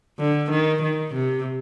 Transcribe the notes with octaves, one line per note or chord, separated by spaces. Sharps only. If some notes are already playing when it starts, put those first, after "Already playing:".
D3
D#3
D#3
C3